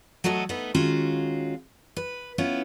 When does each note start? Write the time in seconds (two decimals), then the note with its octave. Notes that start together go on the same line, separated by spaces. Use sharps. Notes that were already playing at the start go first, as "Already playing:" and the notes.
0.24 F#3 A3 F#4 A4 D#5
0.49 A3 B3 D#4 B4
0.74 D#3 G#3 C#4 F4 F#4 F5
1.96 B4
2.38 B3 C#4 E4 F4